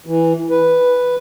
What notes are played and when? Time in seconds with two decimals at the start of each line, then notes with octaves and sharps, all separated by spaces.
0.06 E3
0.50 B4